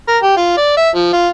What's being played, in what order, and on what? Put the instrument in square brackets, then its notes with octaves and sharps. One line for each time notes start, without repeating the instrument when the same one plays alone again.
[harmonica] A#4
G4
F4
D5
E5
F3
F4